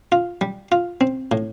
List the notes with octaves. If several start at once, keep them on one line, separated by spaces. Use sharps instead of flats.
F4
G3
F4
C4
A2